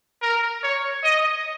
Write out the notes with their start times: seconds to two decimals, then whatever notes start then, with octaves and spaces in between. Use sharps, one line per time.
0.22 A#4
0.63 C#5
1.04 D#5